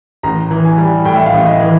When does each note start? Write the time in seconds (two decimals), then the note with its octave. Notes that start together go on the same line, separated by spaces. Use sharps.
0.23 A1 A#5
0.51 E3
0.65 G#5
0.78 G3
1.05 A2 G5
1.16 E5
1.26 F5
1.33 A1
1.46 D#5
1.60 E3